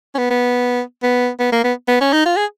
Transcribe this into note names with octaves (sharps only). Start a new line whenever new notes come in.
C#4
B3
B3
B3
B3
A#3
B3
B3
C#4
D#4
F4
G#4